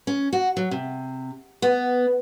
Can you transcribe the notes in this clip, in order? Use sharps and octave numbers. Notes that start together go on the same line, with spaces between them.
C#4
F#4
F#3
C3
B3